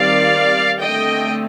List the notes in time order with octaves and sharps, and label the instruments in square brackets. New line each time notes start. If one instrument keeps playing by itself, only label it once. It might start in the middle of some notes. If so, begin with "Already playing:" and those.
Already playing: [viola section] D#3 G3 C4 D5 F5
D3 A3 C4 D#5 G5